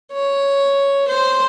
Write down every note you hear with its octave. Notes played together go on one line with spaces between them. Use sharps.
C#5
C5